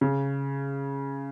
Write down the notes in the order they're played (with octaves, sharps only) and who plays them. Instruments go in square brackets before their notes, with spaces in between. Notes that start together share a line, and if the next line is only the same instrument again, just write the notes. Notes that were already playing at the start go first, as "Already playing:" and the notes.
[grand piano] C#3